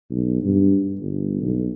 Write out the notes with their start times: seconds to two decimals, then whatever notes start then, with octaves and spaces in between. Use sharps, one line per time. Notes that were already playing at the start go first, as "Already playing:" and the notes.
0.11 B1
0.44 G2
1.00 G1
1.42 B1